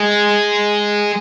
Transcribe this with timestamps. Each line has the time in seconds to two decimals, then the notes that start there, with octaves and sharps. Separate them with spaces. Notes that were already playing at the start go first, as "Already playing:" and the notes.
Already playing: G#3